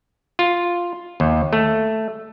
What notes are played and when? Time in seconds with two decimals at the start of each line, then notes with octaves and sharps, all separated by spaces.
0.39 F4
1.20 D#2
1.53 A3